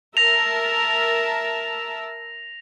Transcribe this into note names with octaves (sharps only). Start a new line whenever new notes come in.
A#4 E5 A5 A#6 F7